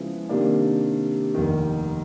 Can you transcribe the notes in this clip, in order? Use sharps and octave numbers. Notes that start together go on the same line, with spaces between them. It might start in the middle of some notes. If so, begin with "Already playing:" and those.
Already playing: C#3 F3 G#3 B3 E4
C3 D#3 G3 A#3 D4
F1 D#2 D#3